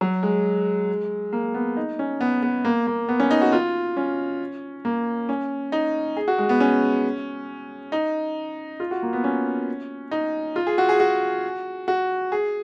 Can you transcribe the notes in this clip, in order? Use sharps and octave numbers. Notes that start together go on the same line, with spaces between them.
F#3
G#3
A#3
B3
D#4
C#4
B3
B3
A#3
A#3
B3
C#4
D#4
F#4
F4
C#4
A#3
C#4
D#4
G#4
F#4
G#3
B3
C#4
D#4
F4
F#4
A#3
B3
C#4
D#4
F4
G#4
F#4
G#4
F#4
F#4
G#4